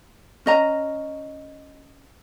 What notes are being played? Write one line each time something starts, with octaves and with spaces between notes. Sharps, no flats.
C#4 D#5 A#5